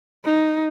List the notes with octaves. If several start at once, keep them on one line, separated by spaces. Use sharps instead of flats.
D#4